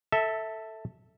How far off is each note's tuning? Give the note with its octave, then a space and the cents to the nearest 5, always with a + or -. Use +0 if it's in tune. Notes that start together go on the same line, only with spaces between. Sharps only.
A4 +10 E5 -15